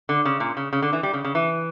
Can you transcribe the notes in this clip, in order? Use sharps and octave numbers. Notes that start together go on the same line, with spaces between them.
D3
C#3
A#2
C#3
C#3
D3
E3
G3
C#3
C#3
E3